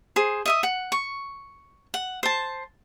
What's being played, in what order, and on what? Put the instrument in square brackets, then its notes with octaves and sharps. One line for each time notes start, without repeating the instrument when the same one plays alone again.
[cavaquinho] G#4 C5
D#5 E5 D#6
F#5
C#6
F#5
C5 A5